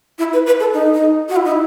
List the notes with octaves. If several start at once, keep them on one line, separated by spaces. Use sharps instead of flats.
E4
B4
B4
A4
D#4
D#4
F#4
E4
D#4
E4